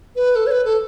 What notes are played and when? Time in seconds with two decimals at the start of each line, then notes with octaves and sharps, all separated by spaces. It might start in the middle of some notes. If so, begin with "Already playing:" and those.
0.16 B4
0.36 A4
0.46 C#5
0.51 B4
0.65 A4